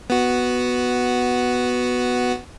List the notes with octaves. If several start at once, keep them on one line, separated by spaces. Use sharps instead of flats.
B3 F#4